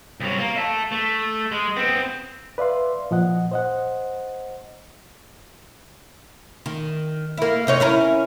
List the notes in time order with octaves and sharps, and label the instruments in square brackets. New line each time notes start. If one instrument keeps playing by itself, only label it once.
[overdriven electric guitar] C2 F#3
A#3
E5 A5
A3
G#3
B3 C4
[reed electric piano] B4 D5 E5 F5 C6
A#2 F3 D#5 F#5
C5 D#5 F#5
[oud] D#3
A#3 E4
C3 D#4 C#5
C#4 E4 A#4